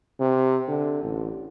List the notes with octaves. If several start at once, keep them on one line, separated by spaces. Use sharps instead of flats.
C3
D3
A1